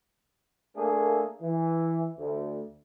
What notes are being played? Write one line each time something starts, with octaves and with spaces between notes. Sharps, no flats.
A3 A#3 D4 G#4 A#4
E3
D2